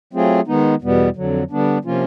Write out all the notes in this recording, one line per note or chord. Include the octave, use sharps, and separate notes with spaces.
F#3 A3 C4 F4 G#4
D#3 G#3 B3 D#4
E2 B2 G3 B3
F2 D3 F#3
D3 G3 B3 D4
C3 F3 A#3 C#4 F4